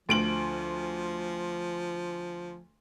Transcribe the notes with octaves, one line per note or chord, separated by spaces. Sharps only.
D2 F3 D7 F#7